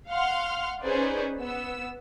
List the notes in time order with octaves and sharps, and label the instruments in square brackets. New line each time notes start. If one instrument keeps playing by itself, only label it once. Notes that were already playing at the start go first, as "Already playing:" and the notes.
[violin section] F5 F#5 C6 F6
C#4 D#4 G#4 B4 C5 D5
B3 E6